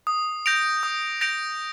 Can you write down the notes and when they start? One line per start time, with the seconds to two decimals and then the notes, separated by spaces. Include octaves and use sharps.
0.07 D#6
0.46 G6 A#6 D7 F7
0.83 D#6
1.21 G6 A#6 D7 F7